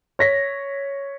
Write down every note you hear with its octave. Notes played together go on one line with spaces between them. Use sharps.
C#5 A#6 B6